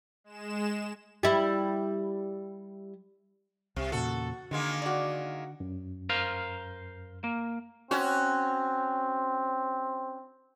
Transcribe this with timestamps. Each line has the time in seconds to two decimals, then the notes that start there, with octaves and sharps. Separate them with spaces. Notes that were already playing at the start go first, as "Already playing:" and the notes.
0.24 G#3 E7
1.23 G3 E4
3.76 C2 C3
3.92 E2 A#2 C#3 F#4 A4
4.51 D3 D#3 G#3 A#3
4.82 F#4 D5
5.60 F#2
6.09 A#4 C5 F5
7.24 A#3
7.91 C4 C#4 F#4